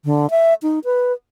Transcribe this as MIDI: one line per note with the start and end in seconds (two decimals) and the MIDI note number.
0.05 0.30 50
0.30 0.54 76
0.63 0.79 63
0.85 1.13 71